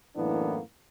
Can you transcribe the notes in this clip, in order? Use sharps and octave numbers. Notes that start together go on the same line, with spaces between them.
F#2 A2 E3 A#3 B3 D4